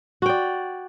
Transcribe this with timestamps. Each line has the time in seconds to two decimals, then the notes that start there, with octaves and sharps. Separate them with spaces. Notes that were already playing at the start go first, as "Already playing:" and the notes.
0.22 F#4
0.26 G5
0.29 D5